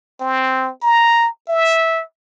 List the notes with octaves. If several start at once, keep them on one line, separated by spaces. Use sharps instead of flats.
C4
A#5
E5